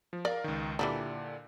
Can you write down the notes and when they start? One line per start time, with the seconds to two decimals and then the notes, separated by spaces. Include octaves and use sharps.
0.13 F3
0.25 A#4 D5 F5
0.44 C#2 D#3
0.79 A#2 D3 E3 G3 D4